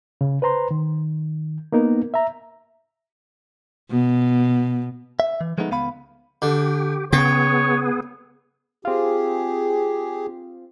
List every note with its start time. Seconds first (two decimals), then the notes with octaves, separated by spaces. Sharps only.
0.21 C#3
0.42 B4 C5 A#5 C6
0.71 D#3
1.72 A#3 B3 D#4 A#4
2.14 E5 A#5
3.90 B2
5.20 E5
5.41 E3
5.58 F3 G#3 A3 B3 D4 D#4
5.71 C#2 B3 F5 B5
6.42 D3 G4
7.13 C#3 B3 G#4 C#5 G5
8.85 C4 F4 G4 G#4